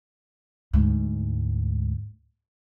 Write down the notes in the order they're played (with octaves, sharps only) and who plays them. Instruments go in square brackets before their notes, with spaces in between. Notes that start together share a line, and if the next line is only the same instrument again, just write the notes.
[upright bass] D2 G#2